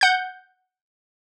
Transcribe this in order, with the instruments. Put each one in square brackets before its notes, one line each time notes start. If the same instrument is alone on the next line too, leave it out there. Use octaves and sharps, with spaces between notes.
[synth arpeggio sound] F#5 G6